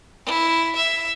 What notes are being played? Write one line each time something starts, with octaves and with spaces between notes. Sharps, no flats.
E4
E5